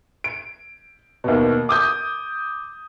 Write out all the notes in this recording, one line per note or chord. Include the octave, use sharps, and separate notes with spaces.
D7
D#2 B2
D6 D#6 G6